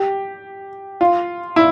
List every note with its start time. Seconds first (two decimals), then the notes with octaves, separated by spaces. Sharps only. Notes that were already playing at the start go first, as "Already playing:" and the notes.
Already playing: G4
1.01 F4
1.56 E4